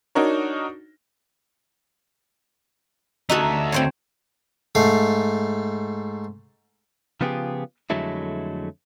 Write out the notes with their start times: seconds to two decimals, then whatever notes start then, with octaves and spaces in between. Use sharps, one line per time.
0.15 D4 D#4 F#4 A#4 C#5
3.29 D2 D#4 F#4 A4 E5
3.72 C4 C5 C#5
4.75 G#2 A3 F5
7.21 C#3 F3 B3 F4 G4 G#4
7.90 F2 D3 F#3 G#3 A3 E4